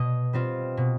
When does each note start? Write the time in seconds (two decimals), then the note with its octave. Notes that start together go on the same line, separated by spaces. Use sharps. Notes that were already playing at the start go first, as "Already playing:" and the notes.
Already playing: B2 D#5
0.33 G3 C4 F4
0.77 B2